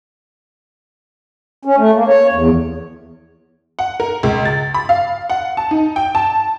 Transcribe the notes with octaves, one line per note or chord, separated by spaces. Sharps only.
C#4
A3
A#3
C#5
E2
F#5
A#4
C#2
A6
B5
F5
F#5
A5
D#4
G5
A5